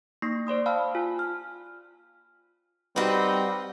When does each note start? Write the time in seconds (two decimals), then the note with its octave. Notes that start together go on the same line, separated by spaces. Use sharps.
0.22 A#3 D#4 C#6 A#6 C7
0.47 C5 D5 C6 D#6
0.66 F5 G5 A5 B5 E6 F6
0.95 F4 G#5
1.19 F6
2.96 G3 C4 D#4 F#4 B4